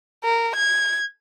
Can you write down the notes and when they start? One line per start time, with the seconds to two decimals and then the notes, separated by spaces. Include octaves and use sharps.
0.25 A#4
0.56 G#6